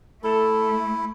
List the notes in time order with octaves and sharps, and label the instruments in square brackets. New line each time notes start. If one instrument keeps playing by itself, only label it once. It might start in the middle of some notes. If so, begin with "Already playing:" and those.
[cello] A3 [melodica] E4 [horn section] A4